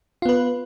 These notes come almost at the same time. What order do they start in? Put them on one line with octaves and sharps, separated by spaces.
F4 B3 B4